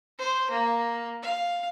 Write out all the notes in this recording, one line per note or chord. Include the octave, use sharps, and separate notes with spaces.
C5
A#3
F5